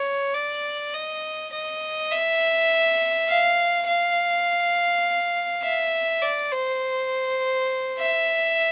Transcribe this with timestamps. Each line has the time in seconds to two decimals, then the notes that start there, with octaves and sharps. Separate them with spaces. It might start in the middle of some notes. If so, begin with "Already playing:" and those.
Already playing: C#5
0.35 D5
0.94 D#5
1.53 D#5
2.11 E5
3.29 F5
3.87 F5
5.63 E5
6.22 D5
6.52 C5
7.99 E5